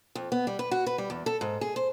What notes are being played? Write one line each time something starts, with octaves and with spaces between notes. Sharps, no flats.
F2
B3
G3
B4
F#4
B4
G3
E2
A4
G#2
G#4
C5